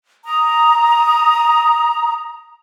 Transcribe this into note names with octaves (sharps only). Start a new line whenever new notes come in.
A#5 D#6